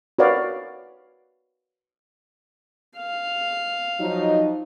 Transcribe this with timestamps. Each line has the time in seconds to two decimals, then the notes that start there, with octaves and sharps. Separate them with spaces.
0.19 F#4 A#4 B4 C#5 D5 F5
2.97 F5
4.00 F3 F#3 D#4